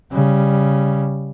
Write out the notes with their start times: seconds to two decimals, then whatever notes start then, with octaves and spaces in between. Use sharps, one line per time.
0.12 C#3 G3